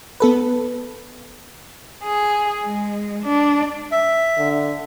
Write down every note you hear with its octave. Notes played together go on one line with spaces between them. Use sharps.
B3 A4 B4
G#4
G#3
D4
E5
D3